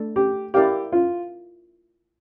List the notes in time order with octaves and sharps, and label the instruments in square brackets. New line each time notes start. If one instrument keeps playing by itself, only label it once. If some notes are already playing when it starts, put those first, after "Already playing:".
Already playing: [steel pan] A3 D4 A4
[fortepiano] G4
[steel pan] E4 A#4 D5 F5 [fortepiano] G4
[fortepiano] F4